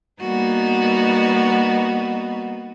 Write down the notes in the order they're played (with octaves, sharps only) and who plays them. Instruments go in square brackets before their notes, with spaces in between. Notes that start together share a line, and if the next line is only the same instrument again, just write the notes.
[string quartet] G3 A#3 B3 D#4 F#4